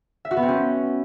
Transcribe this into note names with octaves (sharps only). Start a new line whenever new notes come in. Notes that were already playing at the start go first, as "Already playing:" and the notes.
E5
F#4
B3
C4
C#4